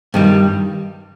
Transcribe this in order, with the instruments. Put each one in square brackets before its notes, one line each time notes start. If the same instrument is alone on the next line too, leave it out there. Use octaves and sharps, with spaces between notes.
[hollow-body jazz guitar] G2 D#3 G3